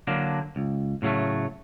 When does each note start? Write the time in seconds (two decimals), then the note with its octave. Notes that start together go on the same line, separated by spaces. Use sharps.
0.07 D3 F#3 A#3 D4
0.56 C#2
1.02 A2 C#3 F#3 A3